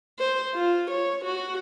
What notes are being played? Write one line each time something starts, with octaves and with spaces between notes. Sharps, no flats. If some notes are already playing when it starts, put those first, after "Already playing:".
C5
F4
C#5
F#4